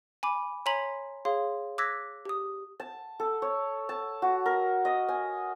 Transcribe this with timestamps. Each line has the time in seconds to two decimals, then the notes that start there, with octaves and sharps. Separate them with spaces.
0.23 G#5 B5 D6
0.66 C#5 G#5 A#5 C6 B6 F#7
1.25 G#4 C#5 F5 C6
1.78 D6 E6 F#6 G#6 A#6 B6
2.25 G4 D#6
2.80 A5
3.20 A4
3.42 C#5
3.89 A5
4.22 F#4
4.46 A#4
4.85 D#5
5.08 G#5